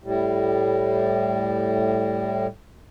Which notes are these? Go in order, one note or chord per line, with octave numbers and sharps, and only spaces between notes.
A2 G3